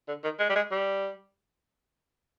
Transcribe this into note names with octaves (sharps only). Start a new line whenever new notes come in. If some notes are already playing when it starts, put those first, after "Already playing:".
D3
D#3
G#3
G3
G#3
G3